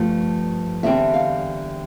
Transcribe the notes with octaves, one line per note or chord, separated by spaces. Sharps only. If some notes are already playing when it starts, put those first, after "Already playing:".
Already playing: G2 F3 A3
E2 D3 G3 C4 E5
F5